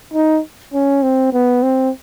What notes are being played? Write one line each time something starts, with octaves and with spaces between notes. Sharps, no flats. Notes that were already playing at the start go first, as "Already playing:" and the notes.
D#4
C#4
C4
B3
C4